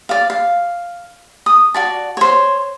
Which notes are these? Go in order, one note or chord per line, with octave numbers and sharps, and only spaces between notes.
D5 F5
F5
D#6
F#4 D5 A5
C5 C#5